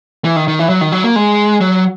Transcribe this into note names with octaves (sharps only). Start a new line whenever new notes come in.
E3
D#3
D#3
E3
F#3
D#3
F#3
A#3
G#3
F#3